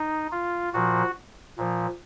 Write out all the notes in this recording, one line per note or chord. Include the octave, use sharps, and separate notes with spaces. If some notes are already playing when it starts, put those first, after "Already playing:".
Already playing: D#4
F4
A#2 F3 F#4
A#2 F3